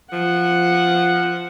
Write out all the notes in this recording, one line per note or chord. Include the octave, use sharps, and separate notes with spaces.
F3 F#5